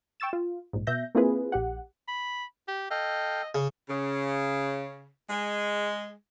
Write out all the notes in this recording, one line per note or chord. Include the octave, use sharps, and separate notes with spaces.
G5 C#6 E6 A6 E7
F4
A#1 G#2
B2 E5 G6 A#6
A#3 C4 E4 F4 G#4 B4
A#1 G4 F#5
B5
G4
A4 D#5 F5 G5
C#3
C#3
G#3